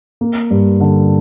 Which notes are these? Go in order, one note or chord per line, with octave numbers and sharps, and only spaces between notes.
A#3
G2
D3